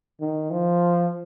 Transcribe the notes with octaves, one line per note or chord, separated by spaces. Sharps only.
D#3
F3